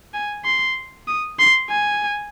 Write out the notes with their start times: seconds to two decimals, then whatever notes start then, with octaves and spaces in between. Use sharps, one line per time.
0.14 G#5
0.45 C6
1.08 D#6
1.39 C6
1.70 G#5